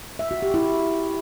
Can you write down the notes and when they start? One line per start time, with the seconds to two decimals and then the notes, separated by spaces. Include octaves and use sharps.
0.19 E5
0.31 F#4
0.42 G4
0.54 E4